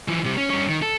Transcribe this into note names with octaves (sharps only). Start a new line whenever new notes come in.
E3 F3
C3 G3
C#4
G2 C#4
D#3
A4